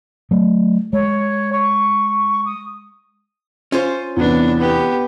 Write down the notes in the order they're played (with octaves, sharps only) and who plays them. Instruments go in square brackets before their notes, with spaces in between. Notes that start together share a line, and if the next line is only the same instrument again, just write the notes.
[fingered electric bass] F#3 A3
[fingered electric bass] G#3 [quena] C#5
[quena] C#6
D#6
[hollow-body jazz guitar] C#4 F4 C5
[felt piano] E2 C3 E3 [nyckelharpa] B3 D4
[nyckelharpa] B3 G4